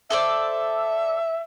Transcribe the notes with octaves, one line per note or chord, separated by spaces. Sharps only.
A4 C5 D5 E5